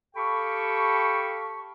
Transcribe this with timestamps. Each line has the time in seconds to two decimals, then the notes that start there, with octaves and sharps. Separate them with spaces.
0.16 G4 A4 F5 G5 B5 C#6